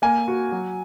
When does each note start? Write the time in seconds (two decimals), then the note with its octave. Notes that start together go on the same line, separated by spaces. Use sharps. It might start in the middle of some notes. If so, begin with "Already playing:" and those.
0.02 A#3 G#5
0.28 F#4
0.52 F#3